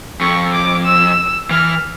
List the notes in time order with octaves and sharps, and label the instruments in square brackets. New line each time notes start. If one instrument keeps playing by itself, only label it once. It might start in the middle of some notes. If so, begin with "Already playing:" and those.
[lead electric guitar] F2 [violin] C#6
[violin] D6
E6
[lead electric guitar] E3 [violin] F6